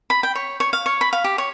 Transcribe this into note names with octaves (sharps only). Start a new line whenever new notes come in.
B5
G5
C#5
C#5
F5
C#5
B5
F5
G4
C#5